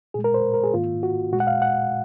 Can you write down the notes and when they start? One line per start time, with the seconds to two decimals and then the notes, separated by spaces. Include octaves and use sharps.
0.14 A#2 G#3 G#4
0.24 A#4
0.34 C5
0.54 A#4
0.64 G#4
0.74 G#2 D#3 A#3 F4
1.03 F#4
1.32 A#2 G#3 F#4
1.40 F#5
1.47 F5
1.62 F#5